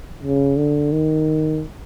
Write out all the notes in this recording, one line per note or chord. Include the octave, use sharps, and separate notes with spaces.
C#3
D3
D#3